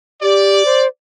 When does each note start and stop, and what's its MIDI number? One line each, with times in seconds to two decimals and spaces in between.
0.22 0.63 67
0.22 0.84 74
0.65 0.87 72